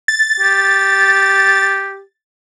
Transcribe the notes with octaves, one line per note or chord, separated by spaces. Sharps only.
A6
G4